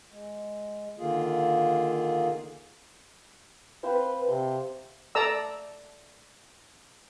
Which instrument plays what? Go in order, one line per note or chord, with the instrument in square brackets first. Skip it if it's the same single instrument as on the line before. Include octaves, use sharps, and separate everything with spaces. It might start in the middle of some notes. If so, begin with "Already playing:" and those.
[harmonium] G#3
D3 D#3 A#3 F4 G#4
[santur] C4 C5 F5 [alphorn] B4
[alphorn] C3 [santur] C6
[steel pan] A4 D5 A5 A#5 E6